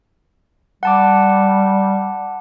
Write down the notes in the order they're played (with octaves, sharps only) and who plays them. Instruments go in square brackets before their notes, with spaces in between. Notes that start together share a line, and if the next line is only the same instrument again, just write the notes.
[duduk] G3 [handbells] F#5 A5 D6